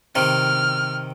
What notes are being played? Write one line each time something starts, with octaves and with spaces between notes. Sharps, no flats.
C3 D#3 F6